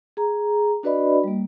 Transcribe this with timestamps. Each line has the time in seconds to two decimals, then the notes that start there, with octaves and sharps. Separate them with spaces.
0.17 G#4 A#5
0.83 D4 F#4 B4 D5 D#5 B5
1.24 G3 A#3